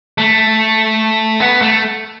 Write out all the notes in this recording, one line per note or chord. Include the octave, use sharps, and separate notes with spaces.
A3
B3
A3